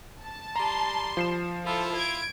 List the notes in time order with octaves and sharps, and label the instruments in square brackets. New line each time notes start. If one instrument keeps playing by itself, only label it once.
[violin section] A5
[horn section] G3 C6 [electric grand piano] A#5
[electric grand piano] F3 C7 E7
[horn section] E4 F4 [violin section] A4
[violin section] G#6 D7